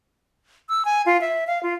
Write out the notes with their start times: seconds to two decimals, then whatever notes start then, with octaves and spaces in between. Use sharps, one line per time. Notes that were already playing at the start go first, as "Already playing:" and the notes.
0.69 E6
0.85 G#5
1.06 F4
1.21 E5
1.47 F5
1.63 F4